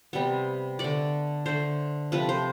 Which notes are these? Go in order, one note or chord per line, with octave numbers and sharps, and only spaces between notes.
C3 G3 B3
D3 A3 D5
D3 A3 C5
C3 F3 A3 B4
C5